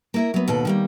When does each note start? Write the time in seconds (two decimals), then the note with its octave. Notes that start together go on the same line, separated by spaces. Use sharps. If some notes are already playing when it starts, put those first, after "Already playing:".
0.14 A#3 E4 A#4
0.34 F#3 B3
0.48 D#2 B2 A4 F#5
0.65 D#3 G3 A#3